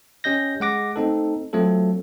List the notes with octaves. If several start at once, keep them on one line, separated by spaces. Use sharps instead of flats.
C#4 G4 D#5 G6 A#6
G#3 F#5 D6 A#6
A3 C4 D#4 A4
F#3 A3 C4 F4 A4